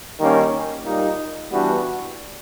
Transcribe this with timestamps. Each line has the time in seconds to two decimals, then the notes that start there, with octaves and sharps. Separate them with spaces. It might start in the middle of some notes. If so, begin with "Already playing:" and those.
0.19 D#3 G3 A#3 C#4
0.85 A#2 G3 A#3 D#4
1.50 E3 G3 B3 D4 F#4